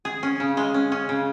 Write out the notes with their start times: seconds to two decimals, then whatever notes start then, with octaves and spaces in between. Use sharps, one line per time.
0.05 G#4
0.23 C#4
0.40 C#3
0.57 G#3
0.74 C#4
0.92 C#4
1.09 C#3